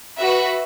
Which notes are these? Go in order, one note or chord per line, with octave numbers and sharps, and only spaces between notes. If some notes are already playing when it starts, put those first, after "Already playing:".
F#4 B4 E5